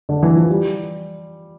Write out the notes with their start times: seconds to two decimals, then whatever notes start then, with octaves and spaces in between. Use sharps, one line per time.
0.09 D3
0.23 E3
0.36 F3
0.50 G3